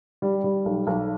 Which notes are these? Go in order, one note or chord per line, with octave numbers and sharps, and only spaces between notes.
G3
G3
B1
B1